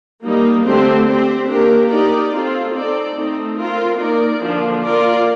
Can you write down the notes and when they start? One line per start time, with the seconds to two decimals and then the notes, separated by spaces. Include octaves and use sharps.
0.23 G3 A#3 D#4
0.65 D3 A3 C4 G4 C5
1.07 C4 G4 C5
1.48 A#3 D4 G4 A#4
1.90 A#3 D#4 G4 A#4 D5
2.32 C4 F4 A4
2.73 C4 D#4 A4 D5
3.16 A3 C4 D#4 A4
3.57 C4 F4 A#4
3.99 A#3 D#4 A#4 D5
4.40 D3 F3 A#3 D4
4.82 A#3 F4 A#4 D5